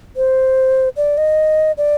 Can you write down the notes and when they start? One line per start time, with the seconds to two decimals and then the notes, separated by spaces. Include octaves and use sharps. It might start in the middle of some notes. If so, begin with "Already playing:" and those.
0.16 C5
0.97 D5
1.18 D#5
1.78 D5